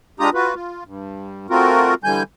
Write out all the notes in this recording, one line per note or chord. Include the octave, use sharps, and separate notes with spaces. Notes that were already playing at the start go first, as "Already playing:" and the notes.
G#3 D4 F4 G4 A#5 D#6
F4 F#4 B4
F4
G2
A3 C4 F4 F#4 A#4
D3 E3 G3 G#5 G6